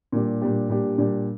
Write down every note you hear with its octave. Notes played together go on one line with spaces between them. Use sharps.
A#2 G3 D4 G4
A#2 G3 D4 G4
A#2 G3 D4 G4
A#2 G3 D4 G4